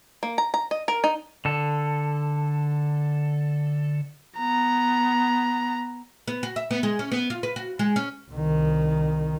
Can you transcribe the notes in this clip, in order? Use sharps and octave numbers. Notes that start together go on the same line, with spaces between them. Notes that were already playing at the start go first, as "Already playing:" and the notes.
A#3
A#5
A#5
D#5
A#4
D#4
D3 A4
B3 A#5
B3
F#4
E5
B3
G#3
C#4
B3
F4
B4
F#4
G#3
C#4
C2 D#3